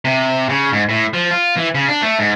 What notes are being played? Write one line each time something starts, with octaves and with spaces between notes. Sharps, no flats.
C3
C#3
G#2
A2
F3
F4
E3
C#3
D4
A3
G#2